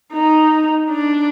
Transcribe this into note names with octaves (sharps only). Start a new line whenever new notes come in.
D#4
D4